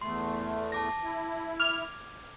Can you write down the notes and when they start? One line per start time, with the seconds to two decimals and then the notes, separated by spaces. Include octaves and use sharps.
0.01 E2 A3 C6
0.72 A5 D6 A#6
1.03 E4
1.60 D6 F6 G#6